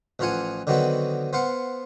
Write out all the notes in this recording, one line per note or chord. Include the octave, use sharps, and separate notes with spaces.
A1 E3 F3 F4 F#5 G#5
D3 D#3 F#3 B3 C4 B4
B3 C5 F5 F#5